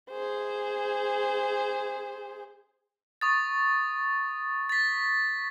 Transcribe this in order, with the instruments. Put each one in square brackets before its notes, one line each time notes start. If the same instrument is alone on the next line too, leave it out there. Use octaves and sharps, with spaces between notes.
[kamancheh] G#4 C5
[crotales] C#6 D#6 A6
A6 B6